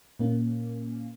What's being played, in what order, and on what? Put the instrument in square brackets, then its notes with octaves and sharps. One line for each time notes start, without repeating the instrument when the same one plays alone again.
[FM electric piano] A#2 A#3 C#4